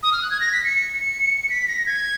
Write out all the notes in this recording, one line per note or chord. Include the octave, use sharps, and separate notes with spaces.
D#6
F6
F#6
G#6
A#6
B6
C#7
B6
A#6
G#6